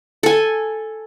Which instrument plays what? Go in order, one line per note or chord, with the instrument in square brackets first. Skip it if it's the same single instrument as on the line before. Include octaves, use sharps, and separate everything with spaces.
[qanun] A4 G#5